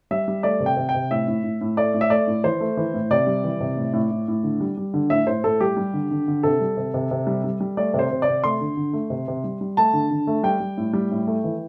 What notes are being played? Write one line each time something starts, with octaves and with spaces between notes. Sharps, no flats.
G3 E5
G3
A3 D5
C3
G5
C3
G5
C3
A2 E5
A2
A2
A2
A3 D5
A2
E5
A3 D5
A2
E3 C5
A3
E3
A2
C3 D5
G3
E3
C3
A2
A2
A2
A2
D3
G3
G3
D3
A2 E5
A2 C5
A2 A4
G3 G4
G3
D3
D3
D3
C3 A4
G3
C3
C3
C3
G3
G3
G3
A3 D5
C3
C5
C3
D5
C3
A3 C6
D3
D3
A3
C3
C3
G3
G3
A3 A5
D3
D3
A3
G3 G5
G3
A2
G3
A2
A3
E3